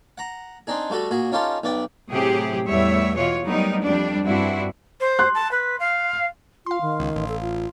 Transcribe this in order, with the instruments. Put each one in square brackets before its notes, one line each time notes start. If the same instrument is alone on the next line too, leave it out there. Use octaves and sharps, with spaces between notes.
[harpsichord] F#5 A#5
C4 D4 D#4 G#4
G3 A3 F#4 A4
A#2 F#4 G#4
C#4 D#4 F4 G4 A4
B1 B3 D5 G5
[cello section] A2 C3 F#3 G4 G#4
E2 A2 G3 C#5 E5
B2 E3 F4 C#5
F#3 G3 A3 B3 D#4 A#4
F2 G3 D4
G2 C4 D4 E4 F#4
[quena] C5
[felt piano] C6 F#6
[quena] A5
B4
F5
[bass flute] F4 [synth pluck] F5 C6
[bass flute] D#3
[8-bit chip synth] C#2
A1
[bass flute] A4
F4